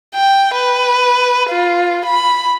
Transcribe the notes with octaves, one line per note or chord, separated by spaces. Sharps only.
G5
B4
F4
B5